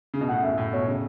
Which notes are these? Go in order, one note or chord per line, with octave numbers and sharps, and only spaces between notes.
C#3
B2
A2 F#5
F#2 E5
A2
B2 C#5
C#3